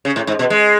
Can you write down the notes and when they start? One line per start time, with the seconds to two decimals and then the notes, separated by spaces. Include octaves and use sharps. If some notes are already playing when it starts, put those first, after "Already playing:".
0.05 C#3
0.16 A2
0.27 G#2
0.39 B2
0.50 G#3